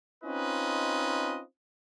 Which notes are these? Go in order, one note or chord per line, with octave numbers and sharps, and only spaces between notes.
C4 C#4 D#4 F4 B4 D#5